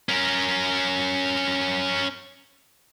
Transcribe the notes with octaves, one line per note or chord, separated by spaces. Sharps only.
C#4 A#4